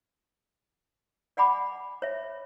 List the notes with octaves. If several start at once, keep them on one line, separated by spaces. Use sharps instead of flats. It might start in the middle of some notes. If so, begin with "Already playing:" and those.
D5 F#5 G#5 B5 D6
C#5 E5